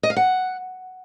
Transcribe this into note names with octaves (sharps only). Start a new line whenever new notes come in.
D#5
F5
F#5